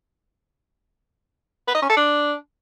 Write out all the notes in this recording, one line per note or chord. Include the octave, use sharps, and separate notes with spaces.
B4
D#5
C#4
A4
D4